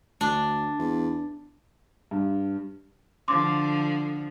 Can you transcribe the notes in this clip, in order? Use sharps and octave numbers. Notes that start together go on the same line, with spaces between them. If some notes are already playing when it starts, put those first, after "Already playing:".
D2 D4
E2
G2
D3 F3 C6 D6